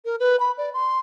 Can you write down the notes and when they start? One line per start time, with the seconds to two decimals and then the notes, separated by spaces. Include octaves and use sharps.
0.05 A#4
0.20 B4
0.40 B5
0.58 D5
0.74 C6